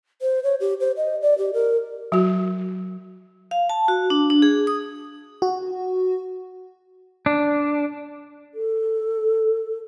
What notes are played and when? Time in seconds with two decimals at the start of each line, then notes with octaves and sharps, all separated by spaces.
0.22 C5
0.43 C#5
0.60 G4
0.80 C5
0.97 D#5
1.22 D5
1.38 G4
1.53 A#4
2.12 F#3 F#4
3.51 F5
3.69 A5
3.88 F#4
4.10 D4
4.30 D4
4.42 G#4
4.67 D#6
5.42 F#4
7.26 D4
8.54 A4